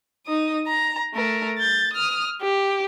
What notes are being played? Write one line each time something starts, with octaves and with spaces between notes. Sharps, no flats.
D#4 D#6
A#5
A3 A#4
G6 A6
D#6 F6
G4